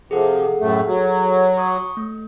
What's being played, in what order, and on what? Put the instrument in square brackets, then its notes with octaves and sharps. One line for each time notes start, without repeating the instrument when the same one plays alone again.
[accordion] C3 F3 [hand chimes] G#4 A4 F#5
[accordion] F#2 A2 A3
F#3
[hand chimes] C#6 D#6
A3